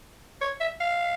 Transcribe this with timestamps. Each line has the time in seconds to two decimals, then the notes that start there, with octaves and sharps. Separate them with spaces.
0.41 C#5
0.60 E5
0.80 F5